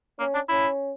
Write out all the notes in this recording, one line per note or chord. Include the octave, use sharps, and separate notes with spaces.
A#3 C#4
D4
C#4 E4